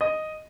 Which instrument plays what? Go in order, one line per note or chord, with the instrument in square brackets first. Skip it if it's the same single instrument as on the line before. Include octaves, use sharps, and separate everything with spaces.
[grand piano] D#5